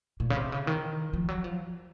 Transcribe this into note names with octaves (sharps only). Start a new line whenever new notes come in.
A#2
C#3
C3
C#3
D#3
F3
F#3
F3